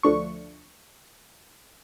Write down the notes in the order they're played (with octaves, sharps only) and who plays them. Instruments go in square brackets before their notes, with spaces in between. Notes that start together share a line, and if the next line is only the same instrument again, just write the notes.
[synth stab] D2 F3 A3 D4 C#6